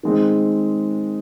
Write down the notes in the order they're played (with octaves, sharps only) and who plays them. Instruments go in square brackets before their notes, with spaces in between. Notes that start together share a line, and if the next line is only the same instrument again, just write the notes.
[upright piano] D#3 G#3 C4